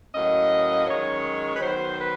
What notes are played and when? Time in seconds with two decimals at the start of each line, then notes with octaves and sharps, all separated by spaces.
0.14 A2 F#3 A#3 C#4 D#5
0.87 F#2 D#3 G#3 C#5
1.54 B4
1.60 D#3 F#3 B3 C5
1.97 B4